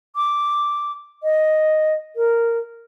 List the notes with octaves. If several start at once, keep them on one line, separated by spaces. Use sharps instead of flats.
D6
D#5
A#4